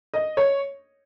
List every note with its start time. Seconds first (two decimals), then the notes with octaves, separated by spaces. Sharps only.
0.14 D#5
0.37 C#5